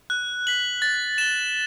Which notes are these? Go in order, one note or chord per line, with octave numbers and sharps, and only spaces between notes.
F#6
B6 F#7
A6
E7 G7